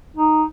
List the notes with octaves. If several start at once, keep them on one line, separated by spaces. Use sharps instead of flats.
D#4